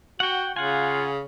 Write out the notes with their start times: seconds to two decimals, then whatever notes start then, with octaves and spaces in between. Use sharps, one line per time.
0.20 F#4 F#5 G5
0.56 C#3 F4 F#5 G#5